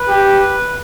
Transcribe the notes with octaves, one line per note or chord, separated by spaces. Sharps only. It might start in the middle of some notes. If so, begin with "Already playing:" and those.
Already playing: B4
G4